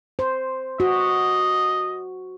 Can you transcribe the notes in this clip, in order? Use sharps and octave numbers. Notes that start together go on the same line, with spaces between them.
C5
F#4 D#5